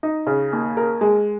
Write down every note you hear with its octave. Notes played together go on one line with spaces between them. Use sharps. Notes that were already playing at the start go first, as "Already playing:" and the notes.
D#4
C#3
D#2
A#4
G#3